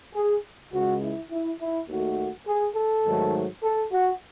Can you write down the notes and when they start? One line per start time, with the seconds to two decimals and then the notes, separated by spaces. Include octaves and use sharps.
0.13 G#4
0.72 C#2 C#3 G#3 F#4
1.01 E4
1.31 E4
1.60 E4
1.88 D#2 D#3 A3 F#4
2.46 G#4
2.75 A4
3.04 G#2 D#3 F#3 A3
3.62 A4
3.91 F#4